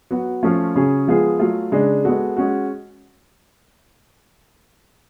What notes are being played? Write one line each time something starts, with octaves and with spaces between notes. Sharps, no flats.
F#3 B3 F#4
F3 A3 C#4 F4
C#3 F#3 C#4 G#4
F3 G#3 B3 F4 G#4
F#3 A3 F4
C#3 G#3 D4 G#4
G#3 B3 F#4 A4
G#3 C#4 F#4